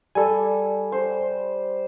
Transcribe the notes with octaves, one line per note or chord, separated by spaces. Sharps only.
G3 A4 G#5
C5